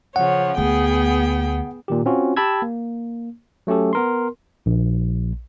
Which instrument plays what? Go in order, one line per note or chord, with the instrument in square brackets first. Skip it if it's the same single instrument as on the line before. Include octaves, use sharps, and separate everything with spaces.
[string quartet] C#3 F3 C#5 [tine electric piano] F#5
[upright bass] D2 [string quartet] B3 G#4 G5
[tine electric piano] A#2 D#3 G4
C4 C#4 F4 F#4
G4 G5 A5 B5 E6 G#6
A#3
F#3 A3 C#4 G4 A4
B3 A#4 C6
A#1